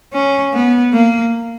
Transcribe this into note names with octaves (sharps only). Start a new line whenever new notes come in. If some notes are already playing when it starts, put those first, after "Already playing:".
C#4
B3
A#3